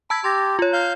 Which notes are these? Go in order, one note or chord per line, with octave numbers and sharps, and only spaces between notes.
A5 B5 E6 G#6
G4 C6 A6 A#6
F4 C#5
F5 G6